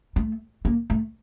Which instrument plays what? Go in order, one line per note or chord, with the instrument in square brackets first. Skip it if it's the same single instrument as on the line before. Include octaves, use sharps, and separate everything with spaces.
[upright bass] A3
A#3
A3